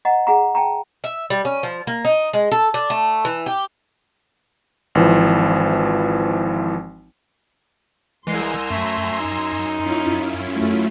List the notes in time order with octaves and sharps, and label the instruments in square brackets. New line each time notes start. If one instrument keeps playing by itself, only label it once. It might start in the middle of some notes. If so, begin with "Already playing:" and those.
[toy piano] D#5 F#5 A#5
G#4 F#5 A#5
G5 A5 A#5
[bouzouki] E5
G3
C#4
F3
A#3
D#4
G#3
A4
D4
A3
E3
G4
[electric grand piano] G#1 E3 F3
[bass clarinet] C2 [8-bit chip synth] E3 G#3 C7 [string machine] G#5 A#5 E6 [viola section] C6
[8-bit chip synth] F#2 [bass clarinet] A3
[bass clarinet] D#4
[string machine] C#4 E4 F4
[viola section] F#3 A3